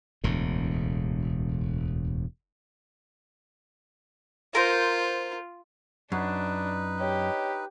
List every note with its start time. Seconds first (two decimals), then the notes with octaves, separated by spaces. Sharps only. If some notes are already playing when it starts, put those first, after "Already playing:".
0.24 E1 D2 A2
4.55 F4 A#4 C5
6.12 F#2 D4 D#4 B4
7.00 G4 C#5 D#5